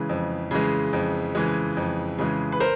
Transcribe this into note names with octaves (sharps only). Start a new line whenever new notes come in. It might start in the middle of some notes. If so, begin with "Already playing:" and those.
Already playing: C#3 E3 G#3
F2
C#3 E3 G#3
F2
C#3 E3 G#3
F2
C#3 E3 G#3
B4
A#4 C5